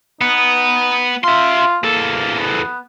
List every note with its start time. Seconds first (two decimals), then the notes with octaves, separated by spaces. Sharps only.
0.21 B3 D#4
1.24 F4 E5 C6
1.84 E2 A#3 A4
2.40 B3